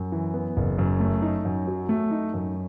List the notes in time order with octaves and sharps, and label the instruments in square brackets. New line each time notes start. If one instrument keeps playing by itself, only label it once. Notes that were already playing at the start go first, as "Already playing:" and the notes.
Already playing: [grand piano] F#2
E3
B3
F#1
F#2
A3
D#4
F#2
F#3
A3
D#4
F#2